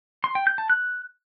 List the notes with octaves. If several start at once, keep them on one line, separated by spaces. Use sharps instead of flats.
C6
G5
G6
A5
F#6